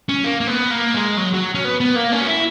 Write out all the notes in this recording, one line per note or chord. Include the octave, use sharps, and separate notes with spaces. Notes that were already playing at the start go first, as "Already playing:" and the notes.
C#4
A#3
A#3
B3
A#3
G#3
F#3
F#3
C#4
B3
B3
A#3
C#4
F#4
E4